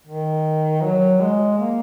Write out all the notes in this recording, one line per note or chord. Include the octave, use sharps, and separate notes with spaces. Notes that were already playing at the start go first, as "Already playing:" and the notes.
D#3
F#3
G#3
A#3